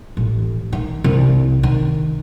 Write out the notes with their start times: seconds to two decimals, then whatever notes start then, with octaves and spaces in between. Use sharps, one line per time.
0.17 A1
0.73 D#3
1.04 C2
1.63 D#3